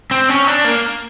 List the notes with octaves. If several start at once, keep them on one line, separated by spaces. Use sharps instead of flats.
C4
C#4
D4
A#3